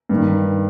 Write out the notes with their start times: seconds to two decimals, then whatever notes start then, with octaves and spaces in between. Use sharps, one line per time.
0.09 G2 D#3